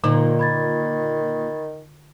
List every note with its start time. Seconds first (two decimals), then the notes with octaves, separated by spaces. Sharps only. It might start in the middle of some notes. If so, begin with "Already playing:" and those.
0.04 A#2 D3 D#3 D#4
0.39 B5 G#6 A6